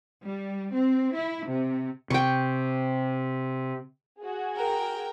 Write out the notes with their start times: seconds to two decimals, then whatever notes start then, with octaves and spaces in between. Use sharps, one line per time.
0.24 G3
0.73 C4
1.15 E4
1.47 C3
2.10 C3 G5 C#6
4.20 F#4 G#4
4.55 A#4 G5